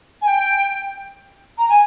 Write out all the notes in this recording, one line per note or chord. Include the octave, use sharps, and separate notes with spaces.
G#5
G5
A#5
G#5